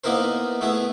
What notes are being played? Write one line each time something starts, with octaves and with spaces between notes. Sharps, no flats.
A#3 B3 D#4 E4 A#4 C5
A3 B3 E4 G#4